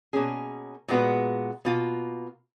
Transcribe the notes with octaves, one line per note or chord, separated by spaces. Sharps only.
B2 A#3 C#4 G#4
A#2 G#3 B3 F#4 B4
B2 A#3 F4